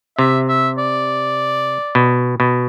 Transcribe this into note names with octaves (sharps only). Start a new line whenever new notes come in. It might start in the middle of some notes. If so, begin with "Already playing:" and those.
C3 E5
E5
D5
B2
B2